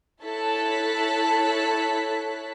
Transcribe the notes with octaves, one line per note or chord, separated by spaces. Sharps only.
E4 A4 C#5 A5 F#6 B6